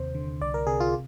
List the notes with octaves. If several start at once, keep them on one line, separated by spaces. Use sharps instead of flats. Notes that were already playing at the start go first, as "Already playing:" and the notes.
Already playing: D#2 C3 C5
D3
C2 D5
A#4
C3 G#4
F4